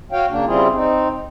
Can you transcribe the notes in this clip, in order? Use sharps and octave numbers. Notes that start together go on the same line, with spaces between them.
F#4 C#5 F5 G5
C#3 A#3 D4
C#3 G3 C4 E4 F4 G#4
C4 D#4